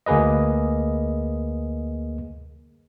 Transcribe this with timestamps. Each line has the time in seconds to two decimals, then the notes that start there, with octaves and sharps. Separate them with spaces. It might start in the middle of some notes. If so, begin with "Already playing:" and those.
0.06 D2 A#3 G#4 B4 D#5